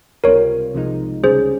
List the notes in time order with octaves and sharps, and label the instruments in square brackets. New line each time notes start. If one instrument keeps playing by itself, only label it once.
[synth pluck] C#2 C3 G3 C4 F4 [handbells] A#4 C#5
[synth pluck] C2 C3 F3 G#3 D#4
[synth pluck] C#2 C3 G3 C#4 [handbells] G#4 C5